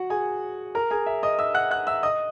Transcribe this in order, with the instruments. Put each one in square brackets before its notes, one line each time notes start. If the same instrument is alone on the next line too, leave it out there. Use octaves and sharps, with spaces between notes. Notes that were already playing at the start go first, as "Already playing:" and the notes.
Already playing: [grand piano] F#4 F#5
G#4 G#5
A#4 A#5
G#4 G#5
E5
D#5 D#6
E5 E6
F#5 F#6
F#5 F#6
E5 E6
D#5 D#6